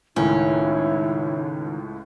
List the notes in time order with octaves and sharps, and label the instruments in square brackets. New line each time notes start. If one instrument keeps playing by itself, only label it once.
[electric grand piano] C#2 A2 [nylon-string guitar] D#3 [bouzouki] C#4 [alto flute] E4